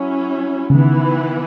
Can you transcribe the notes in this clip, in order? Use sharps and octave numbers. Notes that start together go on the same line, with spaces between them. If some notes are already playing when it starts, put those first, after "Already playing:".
Already playing: F#3 C#4 E4
C#3
D#3 E3 B3 E4 B4